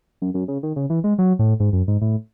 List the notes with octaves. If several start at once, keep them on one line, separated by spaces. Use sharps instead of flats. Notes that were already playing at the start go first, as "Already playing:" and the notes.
F#2
F#2
C#3
D#3
C#3
E3
G#3
F#3
A2
G#2
F#2
G#2
A2